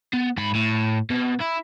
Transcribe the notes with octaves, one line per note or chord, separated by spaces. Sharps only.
B3
G#2 B5
A2
B2
E4